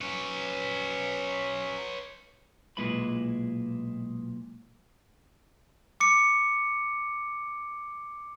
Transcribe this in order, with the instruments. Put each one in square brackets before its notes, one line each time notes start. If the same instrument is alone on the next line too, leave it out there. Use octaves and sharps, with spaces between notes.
[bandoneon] F#3 C#4 [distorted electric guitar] B4 C#5
[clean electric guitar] B1 A#2 G#3 E4 B4 B5
[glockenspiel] D6 C#7